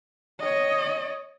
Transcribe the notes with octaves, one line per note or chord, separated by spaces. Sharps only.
C#5 D#5